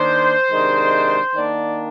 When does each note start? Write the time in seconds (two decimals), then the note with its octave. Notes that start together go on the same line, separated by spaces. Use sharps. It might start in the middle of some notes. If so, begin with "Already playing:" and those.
Already playing: D#3 A#3 D4 C5
0.51 C3 D#3 G#3 D4
1.35 D#3 A#3 D4 D5